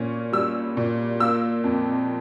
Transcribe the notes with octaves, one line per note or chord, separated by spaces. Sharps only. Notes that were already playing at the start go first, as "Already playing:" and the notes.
Already playing: A#2 C#4
G3 E6
A#2
A#3 E6
F2